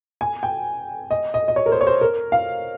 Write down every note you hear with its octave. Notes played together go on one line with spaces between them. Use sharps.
G#5
G5
D#5
D#5
D#5
C#5
A#4
C5
C#5
C5
A#4
F5